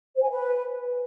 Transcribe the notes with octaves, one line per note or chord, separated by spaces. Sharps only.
C5
G#5
B4